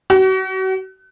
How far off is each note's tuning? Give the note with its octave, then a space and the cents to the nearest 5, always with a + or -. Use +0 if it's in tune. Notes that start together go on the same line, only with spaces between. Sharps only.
F#4 +40